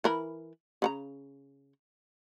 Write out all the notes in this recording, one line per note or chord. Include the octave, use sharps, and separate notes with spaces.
E3 A#4 B5
C#3 F#5 A#5